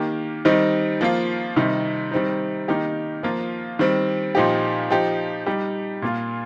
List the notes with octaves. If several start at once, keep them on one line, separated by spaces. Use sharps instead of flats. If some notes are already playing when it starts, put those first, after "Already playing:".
Already playing: D#3 A#3 G4
D#3 G3 C4 D#4
F3 A#3 F4
C3 D#3 G3 D#4
D#3 G3 C4 D#4
D#3 A#3 D#4 G4
F3 A#3 F4
D#3 G3 C4
A#2 F3 D#4 G4
F3 D#4 G4
G3 D#4 G4
A#2 A#3 F4